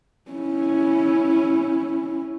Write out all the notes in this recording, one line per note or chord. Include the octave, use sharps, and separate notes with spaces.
C#4 E4